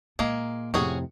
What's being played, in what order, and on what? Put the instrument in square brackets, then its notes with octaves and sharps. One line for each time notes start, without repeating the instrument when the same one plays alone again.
[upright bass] A#2 [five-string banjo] G#3 A#3
[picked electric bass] F2 A2 C3 [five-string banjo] C#4 F#4 G#4